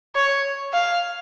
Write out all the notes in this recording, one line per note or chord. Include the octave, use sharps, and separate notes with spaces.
C#5
F5